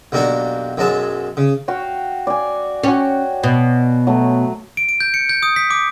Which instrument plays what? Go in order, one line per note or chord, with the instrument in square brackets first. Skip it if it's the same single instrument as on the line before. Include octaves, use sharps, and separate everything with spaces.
[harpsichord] B1 G3 A#3 D4 F#4 F#5
B1 F#2 F#3 G#3 A5
C#3
[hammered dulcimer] F#4 F5 G5
D5 G#5
[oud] C#4 [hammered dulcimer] F#4 C#5 G5
[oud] B2
[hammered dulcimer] F#3 A3
[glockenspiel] D7
D7
G6
C#7
G6
D#6
B6
D6